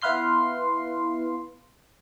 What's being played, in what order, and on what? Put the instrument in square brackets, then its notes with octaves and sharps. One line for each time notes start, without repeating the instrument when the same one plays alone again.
[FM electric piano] B3 E4 B4 F5 C6 C7